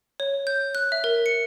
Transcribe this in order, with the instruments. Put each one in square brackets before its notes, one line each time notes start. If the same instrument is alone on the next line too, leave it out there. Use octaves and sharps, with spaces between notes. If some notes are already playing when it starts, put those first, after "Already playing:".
[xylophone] C#5
G6
F#6
E5
A#4
C#7